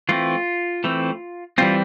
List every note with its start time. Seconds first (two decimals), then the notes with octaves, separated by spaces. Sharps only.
0.09 E3 A3 C4 F4
0.84 E3 A3 C4
1.58 E3 G3 C4 F4